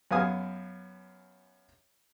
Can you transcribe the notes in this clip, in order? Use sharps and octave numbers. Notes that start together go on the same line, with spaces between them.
F#2 B3 F5 G#5 D#6